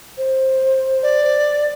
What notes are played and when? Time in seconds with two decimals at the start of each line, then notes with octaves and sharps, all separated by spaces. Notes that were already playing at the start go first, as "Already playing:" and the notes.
0.17 C5
1.03 D5